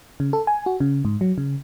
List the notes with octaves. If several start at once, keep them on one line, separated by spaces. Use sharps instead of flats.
C#3
A4
G#5
F#4
C#3
G#2
F#3
C#3